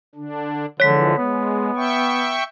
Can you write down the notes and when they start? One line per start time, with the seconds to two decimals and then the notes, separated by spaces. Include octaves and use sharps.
0.15 D3 D4
0.80 D3 E3 F3 G#3 C#5 B6
1.18 G#3 B3
1.76 E5 G5 C#6